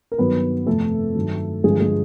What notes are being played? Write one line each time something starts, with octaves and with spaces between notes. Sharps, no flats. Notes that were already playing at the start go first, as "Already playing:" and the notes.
A#4
G2 D#3 F#3 B3 B4
F2 C3 F3 A3 A4
G2 D#3 F#3
G2 D3 F3 G#3 G#4
G#3 G#4